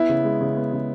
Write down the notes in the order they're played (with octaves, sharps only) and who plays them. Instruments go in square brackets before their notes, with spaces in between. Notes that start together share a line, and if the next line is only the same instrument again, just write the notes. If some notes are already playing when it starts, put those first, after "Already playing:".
Already playing: [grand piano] B3 [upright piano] E4
[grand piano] C#3
G#3
C#3
B3
C#3